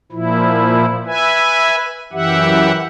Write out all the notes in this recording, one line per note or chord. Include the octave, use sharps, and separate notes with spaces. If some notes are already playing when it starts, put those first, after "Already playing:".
A#2 F3 E4
B4 E5 G#5
F#2 E3 G4 E5 F#5